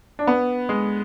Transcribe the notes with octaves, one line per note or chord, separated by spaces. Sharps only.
D4
B3
G#3